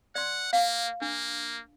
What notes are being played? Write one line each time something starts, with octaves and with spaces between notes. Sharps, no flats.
D5 F#5 C6
A#3 F5
A#3 D4